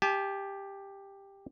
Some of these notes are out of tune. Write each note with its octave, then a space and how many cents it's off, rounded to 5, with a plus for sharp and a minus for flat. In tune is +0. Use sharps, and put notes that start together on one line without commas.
G4 +10 A5 -40